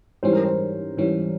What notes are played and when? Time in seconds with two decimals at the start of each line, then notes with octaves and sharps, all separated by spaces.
0.23 G#2 E3 G3 C#4 C5
0.33 A#4
0.44 C5
0.97 G#2 E3 G3 C#4